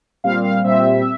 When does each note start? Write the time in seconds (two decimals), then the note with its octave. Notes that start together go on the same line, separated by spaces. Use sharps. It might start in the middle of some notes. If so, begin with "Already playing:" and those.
0.24 A#2 G3 C4 F5
0.44 F5
0.64 A#2 G3 C4 E5